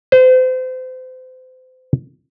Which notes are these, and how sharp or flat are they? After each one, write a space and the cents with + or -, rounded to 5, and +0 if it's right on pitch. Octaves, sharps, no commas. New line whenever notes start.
C5 -35